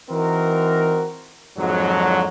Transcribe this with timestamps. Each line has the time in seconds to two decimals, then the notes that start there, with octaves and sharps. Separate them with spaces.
0.10 E3 C4 D#4 F#4 A#4
1.58 F2 G#2 D3 D#3 F3 F#3